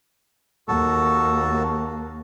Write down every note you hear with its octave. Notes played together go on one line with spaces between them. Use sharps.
D#2 A#3 F#4 A4